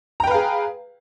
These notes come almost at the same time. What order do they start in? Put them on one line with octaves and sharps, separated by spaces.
A#5 G5 B4 F5 G#4